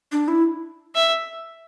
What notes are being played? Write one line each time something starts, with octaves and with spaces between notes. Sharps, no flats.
D4
E4
E5